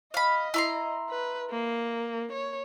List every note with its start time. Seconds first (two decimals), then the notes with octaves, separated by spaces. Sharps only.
0.14 D#5 F5 B5
0.54 E4 A#5 C6
1.09 B4
1.51 A#3
2.32 C#5